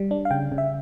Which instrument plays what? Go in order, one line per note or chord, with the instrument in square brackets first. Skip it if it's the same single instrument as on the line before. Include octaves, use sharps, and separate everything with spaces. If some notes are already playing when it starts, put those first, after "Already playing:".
Already playing: [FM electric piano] G3
D4
F5
C#3 G5
C#3
E5